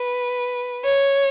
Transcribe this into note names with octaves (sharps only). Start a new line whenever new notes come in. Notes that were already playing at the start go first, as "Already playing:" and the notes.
Already playing: B4
C#5